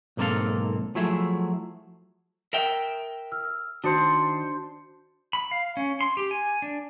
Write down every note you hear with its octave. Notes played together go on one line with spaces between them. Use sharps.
B1 G#2 A#3 C4 A4 F5
F3 F#3 A3 E4 G#4 E5
A#4 E5 G5
E6 F6
D#3 D4 F#4 C5 C#7
B5
F5
C#4
C6
G4
G#5
D4